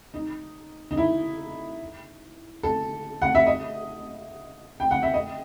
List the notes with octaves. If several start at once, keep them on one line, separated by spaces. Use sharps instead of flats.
D#4
D#4
E4
A4
F#5
E5
D#5
G5
F#5
E5
D#5